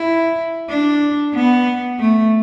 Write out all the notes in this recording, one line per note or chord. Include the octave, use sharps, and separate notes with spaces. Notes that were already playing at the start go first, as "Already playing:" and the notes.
Already playing: E4
D4
B3
A3